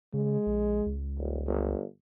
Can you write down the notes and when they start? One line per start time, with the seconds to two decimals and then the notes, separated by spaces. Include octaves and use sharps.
0.14 C#3 G#3
0.47 A#1
0.86 C#2
1.18 D#1
1.47 G1